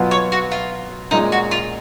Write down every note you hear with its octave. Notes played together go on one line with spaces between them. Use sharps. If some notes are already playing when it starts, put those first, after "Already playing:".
Already playing: B2 F#3 B3 F4
C#5
F#4
F4
A#2 G#3 C#4 D#4 G#4
F#4
F4